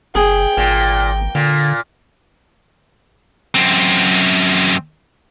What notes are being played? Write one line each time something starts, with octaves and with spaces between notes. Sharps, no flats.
F#1 G#4 G5
G#1 A#2
A#2 D3
F#2 C4